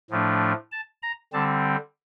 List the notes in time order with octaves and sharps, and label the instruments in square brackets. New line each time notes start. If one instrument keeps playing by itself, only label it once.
[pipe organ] A2 F3 A3 D4
A5
A#5
D3 G3 C4 A5